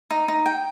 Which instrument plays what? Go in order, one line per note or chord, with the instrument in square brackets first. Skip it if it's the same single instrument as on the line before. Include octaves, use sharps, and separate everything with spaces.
[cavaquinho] D#4
D#4
G5